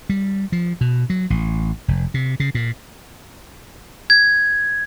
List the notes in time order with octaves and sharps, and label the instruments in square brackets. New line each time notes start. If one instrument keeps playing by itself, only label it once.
[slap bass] G3
F3
B2
F#3
A1
F1
C3
C#3
A#2
[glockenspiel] G#6